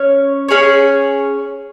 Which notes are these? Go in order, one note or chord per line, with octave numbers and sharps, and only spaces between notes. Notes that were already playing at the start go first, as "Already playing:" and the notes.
Already playing: C#4 C#5
C#4 G#4 C#5